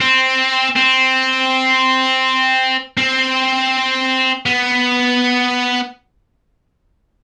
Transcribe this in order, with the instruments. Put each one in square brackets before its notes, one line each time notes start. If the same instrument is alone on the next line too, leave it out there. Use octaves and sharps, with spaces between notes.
[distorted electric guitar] C4
C4
C4
B3